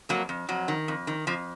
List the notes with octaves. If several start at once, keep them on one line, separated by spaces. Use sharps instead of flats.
F2 F#3 A#3
F2
F2 F#3
D#3
F2
D#3
F2 F3